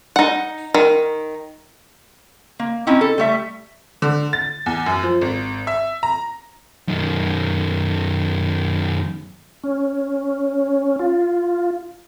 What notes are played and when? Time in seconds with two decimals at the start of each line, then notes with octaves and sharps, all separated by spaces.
0.16 D#4 F#5
0.74 D#3
2.59 A#3
2.87 C4 C#4 D#4 E4
3.01 A4
3.18 G3 A3 E5
4.02 D3
4.33 A6
4.66 E2
4.86 F#2
5.03 F3
5.21 G#1
5.67 E5
6.03 A#5
6.88 F#2 D#3
9.64 C#4
10.99 F4